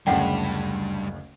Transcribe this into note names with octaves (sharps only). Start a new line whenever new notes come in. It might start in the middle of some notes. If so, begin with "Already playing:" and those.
F#1 D2 G2 C#3 A4 F#5 G5